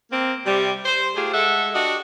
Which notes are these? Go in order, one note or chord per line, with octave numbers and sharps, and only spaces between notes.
A#3 C4
C3 G3
C5
A3 F4 G4 G#4
G#3 A4 E5 F#5
D4 F#4 G4 D#5